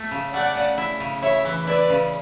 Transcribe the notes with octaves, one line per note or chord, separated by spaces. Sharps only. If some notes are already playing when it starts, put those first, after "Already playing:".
Already playing: A3
C#3
A3 D5 F#5
C#3
E4
C#3
E4 C#5 E5
E3
E4 B4 D5
C#3